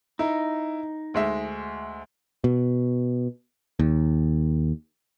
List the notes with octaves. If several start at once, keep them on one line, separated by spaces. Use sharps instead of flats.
D#4 E4
D2 G#3 E5
B2
D#2